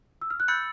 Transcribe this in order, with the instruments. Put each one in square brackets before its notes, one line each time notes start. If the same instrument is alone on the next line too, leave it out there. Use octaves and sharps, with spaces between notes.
[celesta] E6
F6
F#6
[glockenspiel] B5 E6 A6 C#7 [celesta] G6